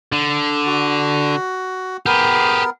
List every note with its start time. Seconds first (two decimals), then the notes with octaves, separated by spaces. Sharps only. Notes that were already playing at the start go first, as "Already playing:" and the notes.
0.12 D3
0.66 F#4
2.06 B3 G4 G#4 A#4